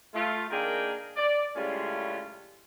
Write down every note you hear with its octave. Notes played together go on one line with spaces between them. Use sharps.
A3 F4
D#3 A#3 D4 G#4 A#4 G5
D5
A2 C#3 G3 G#3 C#4 F4